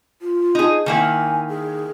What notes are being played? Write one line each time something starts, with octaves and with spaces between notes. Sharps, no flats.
F4
D#4 G#4
D#3 A#3 E4 G#5
G#4